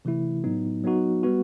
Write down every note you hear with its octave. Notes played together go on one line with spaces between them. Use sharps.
C3 E3 A3 E4
A2 F#3 B3 D#4
F#3 B3 D#4 F#4
G3 B3 F#4